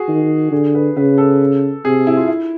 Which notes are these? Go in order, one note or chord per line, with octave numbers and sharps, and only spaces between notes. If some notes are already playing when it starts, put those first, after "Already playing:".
Already playing: F#4 G#4
D#3
D3 G#4
B4
C#3 B4
A4
C3 G#4
E4
F4
E4